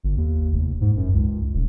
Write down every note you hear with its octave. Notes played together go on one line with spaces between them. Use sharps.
G1
D#2
F1
G#2
F#2
C#2
D#1